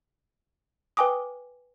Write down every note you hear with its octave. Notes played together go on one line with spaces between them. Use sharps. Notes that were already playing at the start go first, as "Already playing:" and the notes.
B4 G5 G#5 D6 D#6